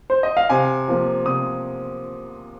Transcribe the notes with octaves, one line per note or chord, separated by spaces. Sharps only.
C5
D#5
F5
C3 G#5
F3 A#3
C3 D#6